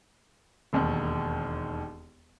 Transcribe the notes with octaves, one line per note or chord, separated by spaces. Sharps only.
E1 D#2 D#3